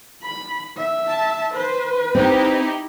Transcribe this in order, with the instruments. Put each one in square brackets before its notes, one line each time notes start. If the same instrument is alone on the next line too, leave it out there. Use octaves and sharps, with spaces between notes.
[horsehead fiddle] B5
E5
[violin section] A5
[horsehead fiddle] B4 [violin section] C5
[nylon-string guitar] C4 [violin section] D#4 E4 G4